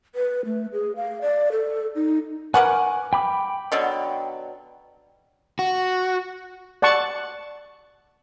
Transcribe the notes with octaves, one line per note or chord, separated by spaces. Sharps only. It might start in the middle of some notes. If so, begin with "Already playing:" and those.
B4
A3
G#4
F5
D5
A4
D#4
A#4 B4 F#5 G#5 C#6 D6
G5 B5 D6
B2 D3 F#3
F#4
D5 F#5 A5 C#6